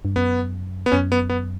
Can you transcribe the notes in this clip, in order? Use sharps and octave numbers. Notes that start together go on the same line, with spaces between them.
G2
F#2 B3
B3
F#2 C#4
B3
B3